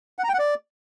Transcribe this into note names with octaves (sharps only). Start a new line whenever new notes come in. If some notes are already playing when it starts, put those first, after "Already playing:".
F#5
A#5
G5
F#5
D5